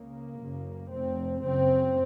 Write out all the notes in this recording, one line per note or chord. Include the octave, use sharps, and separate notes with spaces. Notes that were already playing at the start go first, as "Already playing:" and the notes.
Already playing: C#2 C#3 A#3
F#1 F#2 C#3
F1 F2 C3 C4
F#1 F#2 C#3 C4